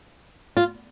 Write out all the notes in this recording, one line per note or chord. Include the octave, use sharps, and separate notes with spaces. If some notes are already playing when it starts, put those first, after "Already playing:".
F4